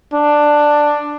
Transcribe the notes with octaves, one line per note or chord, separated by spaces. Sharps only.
D4